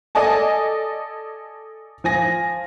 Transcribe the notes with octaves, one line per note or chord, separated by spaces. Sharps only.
A4 D5 D#5 G#5 A5
F3 G#5 A#6